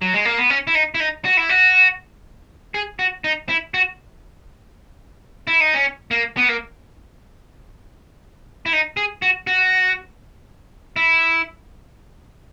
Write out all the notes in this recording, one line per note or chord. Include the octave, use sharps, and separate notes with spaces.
F#3
G#3
A#3
B3
C#4
E4
D#4
E4
D#4
F#4
E4
F#4
G#4
F#4
D#4
E4
F#4
E4
D#4
C#4
A#3
B3
A#3
E4
D#4
G#4
F#4
F#4
E4